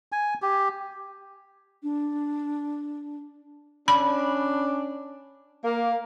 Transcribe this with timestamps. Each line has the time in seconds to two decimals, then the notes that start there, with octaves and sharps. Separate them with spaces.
0.12 G#5
0.42 G4
1.83 D4
3.88 C#4 D4 B5
5.63 A#3